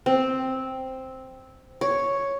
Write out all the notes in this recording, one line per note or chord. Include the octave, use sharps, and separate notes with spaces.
C4
C#5